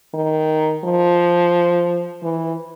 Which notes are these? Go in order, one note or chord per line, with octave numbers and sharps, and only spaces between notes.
D#3
F3
E3